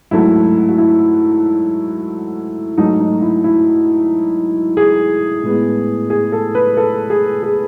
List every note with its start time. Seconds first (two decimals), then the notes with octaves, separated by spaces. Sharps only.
0.11 G#2 F#3 A3 E4
0.69 F#4
0.78 E4
2.78 G#2 F#3 A3 D#4
3.00 D#4
3.22 E4
3.44 E4
4.77 G#4
5.43 A2 G#3 B3
6.10 G#4
6.32 A4
6.55 B4
6.77 A4
7.10 G#4
7.43 G#4